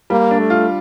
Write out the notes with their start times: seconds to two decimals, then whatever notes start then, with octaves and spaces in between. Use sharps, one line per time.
0.10 G3 A#3
0.31 D4
0.40 A3
0.50 F4